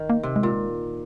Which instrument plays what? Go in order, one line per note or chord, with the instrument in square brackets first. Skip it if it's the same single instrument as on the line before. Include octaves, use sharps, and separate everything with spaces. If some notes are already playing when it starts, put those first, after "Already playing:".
Already playing: [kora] D#3
[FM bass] A#3
[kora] C3
[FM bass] G#3
[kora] A#2